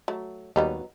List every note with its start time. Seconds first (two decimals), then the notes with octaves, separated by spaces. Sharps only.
0.08 F#3 A3
0.56 D#2 F#3 G3 B3 D#4